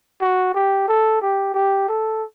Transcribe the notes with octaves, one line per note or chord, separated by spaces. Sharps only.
F#4
G4
A4
G4
G4
A4